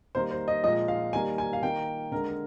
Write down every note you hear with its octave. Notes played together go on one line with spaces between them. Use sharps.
D#3 G3 A#3 C5
C5
D#5
A#2 F3 G#3 D#5
F5
D#3 G3 A#3 G#5
G#5
F5
D#3 A#3 G5
D3 G#3 A#4
A#4